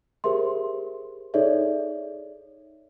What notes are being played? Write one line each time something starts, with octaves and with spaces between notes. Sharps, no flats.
G4 G#4 A#4 C5 E5 C6
D#4 G#4 A4 C#5 D5 E5